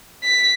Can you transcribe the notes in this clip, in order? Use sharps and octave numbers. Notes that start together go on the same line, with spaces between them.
B6